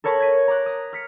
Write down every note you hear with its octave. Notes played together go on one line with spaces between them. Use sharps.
A4 A#4 C#5 A5 B5 C#6
G#6 B6 D#7
A#5 D6 F#6
D#6
F6 B6 C#7